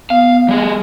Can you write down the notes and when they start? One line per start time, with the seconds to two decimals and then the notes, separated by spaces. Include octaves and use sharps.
0.10 B3 F5
0.48 G3 G#4